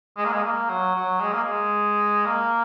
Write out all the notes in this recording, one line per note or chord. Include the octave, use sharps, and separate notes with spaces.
G#3
A#3
G#3
A#3
F#3
F#3
G#3
A#3
G#3
A#3